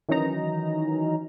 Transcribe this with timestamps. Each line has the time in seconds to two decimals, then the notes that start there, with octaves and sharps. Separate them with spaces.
0.09 D#3 E3 F#3 C#4 D#4 A#5